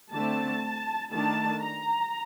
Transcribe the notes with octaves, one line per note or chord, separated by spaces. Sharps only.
D3 A3 C4 A5
D#3 A3 D4 A5
A#5